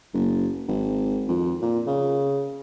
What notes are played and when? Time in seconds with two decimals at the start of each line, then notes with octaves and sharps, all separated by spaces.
0.14 F#1
0.68 G#1
1.29 F2
1.62 A#2
1.87 C#3